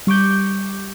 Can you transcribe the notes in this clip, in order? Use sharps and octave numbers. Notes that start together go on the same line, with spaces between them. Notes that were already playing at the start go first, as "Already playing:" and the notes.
G3 C#6 D6 G6